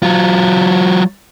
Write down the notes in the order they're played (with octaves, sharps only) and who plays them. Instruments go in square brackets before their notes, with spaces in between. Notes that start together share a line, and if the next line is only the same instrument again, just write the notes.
[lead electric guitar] F#3 F4